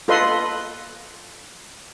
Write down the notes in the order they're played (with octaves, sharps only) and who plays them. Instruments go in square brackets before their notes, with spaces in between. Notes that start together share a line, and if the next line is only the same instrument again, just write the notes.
[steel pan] F4 A4 B4 D#5 C6